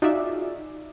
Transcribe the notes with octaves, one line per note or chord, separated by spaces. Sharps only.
D#4 F4 F#4 G#4 D5 E5